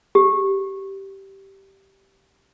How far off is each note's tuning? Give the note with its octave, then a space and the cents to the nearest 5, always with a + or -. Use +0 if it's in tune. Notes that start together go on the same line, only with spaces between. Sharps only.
G4 -10